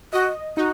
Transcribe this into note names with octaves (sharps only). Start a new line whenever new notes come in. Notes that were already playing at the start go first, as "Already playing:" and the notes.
F#4 D#5
D#4 F#4